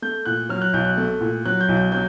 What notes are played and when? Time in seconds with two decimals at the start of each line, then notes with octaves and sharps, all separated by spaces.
0.02 A3 G6
0.25 A#2 F#6
0.49 F#3 F6
0.62 F#6
0.73 B1 G6
0.85 F#6
0.98 A3
1.21 A#2
1.45 F#3 F#6
1.61 G6
1.69 B1
1.77 G6
1.92 F#3 G6